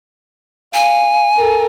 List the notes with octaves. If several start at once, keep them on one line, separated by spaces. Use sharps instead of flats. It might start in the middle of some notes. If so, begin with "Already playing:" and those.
F5 G#5
A4 A#4